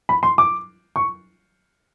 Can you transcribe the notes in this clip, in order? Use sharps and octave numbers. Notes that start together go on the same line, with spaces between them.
B5
C6
D6
C#6